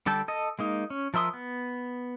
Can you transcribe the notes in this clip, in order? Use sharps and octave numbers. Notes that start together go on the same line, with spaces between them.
D3 G3 A4 G5 A5
A4 D#5
G#3 A#3 D#4
C#4
F3 A#4 E5 C6 D#6
B3